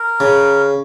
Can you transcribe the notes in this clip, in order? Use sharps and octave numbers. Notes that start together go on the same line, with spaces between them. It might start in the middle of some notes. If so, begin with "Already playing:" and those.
Already playing: A#4
C#3